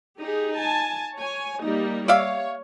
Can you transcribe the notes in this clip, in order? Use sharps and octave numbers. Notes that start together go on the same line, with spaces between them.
D#4 G4 G#4
G#5 A5
C#5 G#5
G3 A#3 D#4
C#5 D5 E5 F5